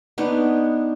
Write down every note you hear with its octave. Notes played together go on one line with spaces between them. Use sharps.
B3 D4 D#4 C#5